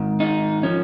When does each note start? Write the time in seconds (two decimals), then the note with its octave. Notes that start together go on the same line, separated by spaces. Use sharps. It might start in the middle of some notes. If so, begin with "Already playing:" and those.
Already playing: G#2 D#3
0.20 D#4
0.63 F3 C#4